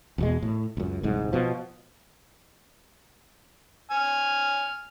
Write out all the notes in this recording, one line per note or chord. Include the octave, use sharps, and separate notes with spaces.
E2 B2 G#3
A2
C#2 F#2
D#1 C2 G#2
B2 F3
G#5 F6